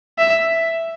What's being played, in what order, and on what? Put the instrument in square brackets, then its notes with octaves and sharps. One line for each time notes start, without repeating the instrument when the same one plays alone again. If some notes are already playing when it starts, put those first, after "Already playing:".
[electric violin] E5